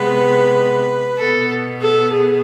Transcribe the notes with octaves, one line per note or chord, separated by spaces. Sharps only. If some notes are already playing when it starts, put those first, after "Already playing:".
Already playing: C3 G#3 B3 B4
B2 B3 A4
A4
G#4